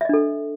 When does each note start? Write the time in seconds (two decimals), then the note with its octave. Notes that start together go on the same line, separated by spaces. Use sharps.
0.01 E5
0.05 D#5
0.09 D4
0.13 A4